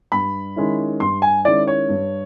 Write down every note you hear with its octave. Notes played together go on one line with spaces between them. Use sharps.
G2 B5
D#3 G#3 C#4 E4
G2 C6
G#5
D#3 G#3 C#4 E4 D5
C#5
G2